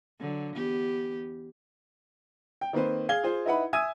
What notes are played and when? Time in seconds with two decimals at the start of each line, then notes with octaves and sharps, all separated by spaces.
0.20 D3 F#3
0.55 E2 B3 G4
2.61 G5
2.73 D#3 A#3 C4 B4 C5
3.09 G#4 F5 G#6 G7
3.23 F4 G#4 C5
3.46 D#4 E4 B4 F#5 B5
3.73 E5 G#5 D#6 E6 G#6 D#7